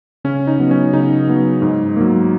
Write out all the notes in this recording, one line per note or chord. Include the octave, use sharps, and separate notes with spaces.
C#3 C#4
D#4
F#3 B3
C#4
C#3 D#4
F#3 B3
G#2
F#3 A#3